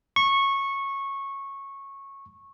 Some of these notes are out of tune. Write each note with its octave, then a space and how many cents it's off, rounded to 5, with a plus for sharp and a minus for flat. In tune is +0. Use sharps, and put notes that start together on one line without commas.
C#6 -15